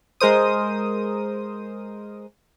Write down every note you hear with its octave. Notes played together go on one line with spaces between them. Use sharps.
G#3 A#4 C5 D#6